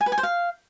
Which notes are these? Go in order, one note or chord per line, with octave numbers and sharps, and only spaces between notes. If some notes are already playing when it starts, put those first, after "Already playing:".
G#5
B4
G#5
C5
F5